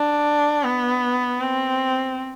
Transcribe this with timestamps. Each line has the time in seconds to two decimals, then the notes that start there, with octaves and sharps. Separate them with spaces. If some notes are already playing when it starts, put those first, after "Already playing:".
Already playing: D4
0.64 B3
1.41 C4